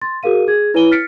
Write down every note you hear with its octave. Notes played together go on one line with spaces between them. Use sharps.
C6 A6
F#4 G#4 A#4 F5 D#7
G#4 G#6
E4 B4 C#5 G#5 D#7 G7
F6 A6 B6 C#7 D7